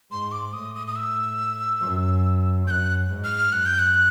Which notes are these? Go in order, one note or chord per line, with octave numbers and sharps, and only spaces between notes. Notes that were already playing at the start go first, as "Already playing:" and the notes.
G#2 C6
D6
A2 D#6
D#6
D#6
E6
F#2
F#2 F#6 G6
G#2
F6
F#2 F#6
G6
F#6